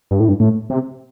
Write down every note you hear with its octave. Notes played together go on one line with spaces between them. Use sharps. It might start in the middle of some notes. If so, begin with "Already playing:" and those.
G2
A2
G2
A2
C3